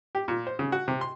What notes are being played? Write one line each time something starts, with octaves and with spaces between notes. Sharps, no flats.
G4
A#2
C5
C#3
F#4
C3
C6